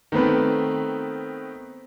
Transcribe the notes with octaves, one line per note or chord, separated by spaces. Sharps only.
D#3 A3 B3 C4 B4